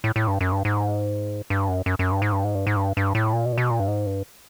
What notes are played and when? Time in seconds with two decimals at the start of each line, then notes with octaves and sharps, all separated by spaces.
0.04 A2
0.16 A2
0.28 G2
0.41 F#2
0.52 G2
0.65 G#2
1.50 G2
1.68 F#2
1.86 F#2
1.99 F#2
2.12 G2
2.22 G#2
2.32 G2
2.44 G#2
2.55 G2
2.67 G#2
2.76 G2
2.97 G2
3.15 A2
3.33 A#2
3.45 B2
3.53 A#2
3.58 B2
3.70 A#2
3.80 G2
3.88 G#2
4.06 G2